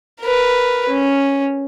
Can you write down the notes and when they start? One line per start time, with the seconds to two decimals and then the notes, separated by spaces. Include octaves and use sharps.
0.21 A#4 B4
0.89 C#4